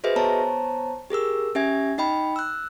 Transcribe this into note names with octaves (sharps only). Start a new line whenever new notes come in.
F#4 G#4 B4 C5 D#5 E5
B3 C5 C#5 A5 A#5
G4 G#4 A#4 E6
C#4 G4 E5 G#5 G#6
D#4 D#5 G5 B5
E6 F#6